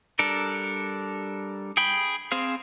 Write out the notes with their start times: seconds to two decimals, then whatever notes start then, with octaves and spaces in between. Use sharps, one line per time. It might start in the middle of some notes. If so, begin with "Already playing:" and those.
0.19 G3 D4 A4 A#4
1.77 G#4 G5 B5
2.32 C4 G#4 C5 F5